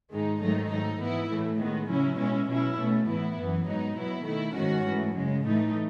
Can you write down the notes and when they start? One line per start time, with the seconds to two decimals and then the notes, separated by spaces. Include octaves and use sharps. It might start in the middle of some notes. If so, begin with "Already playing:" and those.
0.11 G#2 D#3 G#3 D#4
0.41 G#2 D#3 F#3 A3 D#4
0.70 G#2 F#3 A3 D#4
1.00 G#2 E3 B3 E4
1.29 A2 E3 A3
1.59 D#3 G#3 B3
1.88 C#3 F#3 C#4 E4
2.18 B2 G#3 C#4 E4
2.47 B2 F#3 C#4 E4
2.77 B2 A3 C#4
3.07 A2 E3 B3 E4
3.37 F#2 E3 B3
3.66 G#2 F#3 B3 D#4
3.96 B2 F#3 B3 E4
4.25 D#3 A3 E4
4.55 G#2 D#3 G#3 C#4 F#4
4.84 G#2 E3 A3
5.14 F#2 C#3 G#3
5.44 A2 E3 A3 D#4